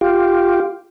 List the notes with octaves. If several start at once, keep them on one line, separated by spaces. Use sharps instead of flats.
F4 G4